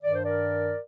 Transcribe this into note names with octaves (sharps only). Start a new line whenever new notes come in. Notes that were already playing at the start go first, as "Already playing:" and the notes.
G2 D#3 D5
C5
A#4 D5